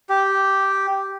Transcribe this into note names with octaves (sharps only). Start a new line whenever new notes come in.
G4